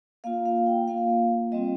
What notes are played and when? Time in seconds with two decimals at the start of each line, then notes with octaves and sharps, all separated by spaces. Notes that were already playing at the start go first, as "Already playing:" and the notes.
0.24 A#3 F4 F5
0.46 F5
0.67 G5
0.88 A#3 F4 F5
1.52 G3 C4 F4 D#5